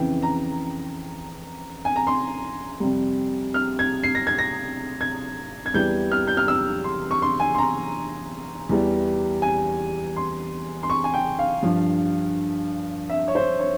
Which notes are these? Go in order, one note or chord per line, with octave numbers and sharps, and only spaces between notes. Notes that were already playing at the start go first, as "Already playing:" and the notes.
Already playing: F2 C#3 E3 G5
A#5
G#5
A#5
C6
F2 C3 G3
F6
G#6
C7
A#6
G#6
A#6
G#6
G#6
E2 E3 G3 G6
F6
G6
F6
E6
C6
C#6
C6
G#5
C6
A#5
E2 E3 G3
G#5
C6
C6
C#6
G#5
G5
F5
G2 F3
E5
C#5
C5
C#5